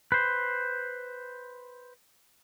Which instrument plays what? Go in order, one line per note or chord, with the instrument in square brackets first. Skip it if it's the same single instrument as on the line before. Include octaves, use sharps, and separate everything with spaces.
[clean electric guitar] B4 C5